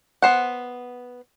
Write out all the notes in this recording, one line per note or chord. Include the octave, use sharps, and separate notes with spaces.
B3 C5 F#5